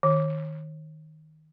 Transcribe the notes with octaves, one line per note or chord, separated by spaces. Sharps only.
D#3